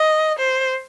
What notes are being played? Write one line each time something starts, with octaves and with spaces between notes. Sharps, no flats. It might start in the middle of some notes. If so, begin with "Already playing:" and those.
Already playing: D#5
C5